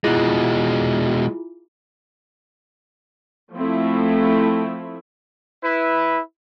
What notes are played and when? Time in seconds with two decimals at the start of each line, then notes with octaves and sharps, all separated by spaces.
0.04 B2 G#3 E4 F4 G#4
3.53 F3 A3 C4 E4
5.63 E4 B4